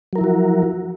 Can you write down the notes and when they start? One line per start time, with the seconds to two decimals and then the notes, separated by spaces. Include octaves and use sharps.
0.13 F#3
0.15 A#4
0.18 E4
0.21 F3
0.24 F#4